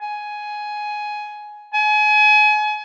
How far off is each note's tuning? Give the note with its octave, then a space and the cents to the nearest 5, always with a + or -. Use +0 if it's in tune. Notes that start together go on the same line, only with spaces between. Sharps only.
G#5 +10
G#5 +30